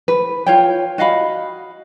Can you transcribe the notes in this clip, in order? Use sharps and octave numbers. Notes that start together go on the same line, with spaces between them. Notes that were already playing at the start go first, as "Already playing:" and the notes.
B4
F4 C#5 G5
F#4 D#5 F5 B5